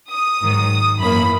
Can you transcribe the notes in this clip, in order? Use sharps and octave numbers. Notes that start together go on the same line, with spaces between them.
D#6
G#2 D#3 F#3
F#2 E3 A#3 B5